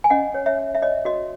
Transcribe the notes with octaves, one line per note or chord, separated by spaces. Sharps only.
G#5
C#4 D#5 F#5
C#5
C#5 E5
C#5
E5
C#5 D#5
F#4 D#5